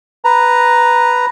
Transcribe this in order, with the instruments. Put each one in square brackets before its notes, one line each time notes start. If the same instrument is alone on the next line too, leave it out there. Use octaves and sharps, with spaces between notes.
[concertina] B4 A#5